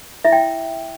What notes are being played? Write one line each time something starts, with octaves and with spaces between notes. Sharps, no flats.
E4 E5
G5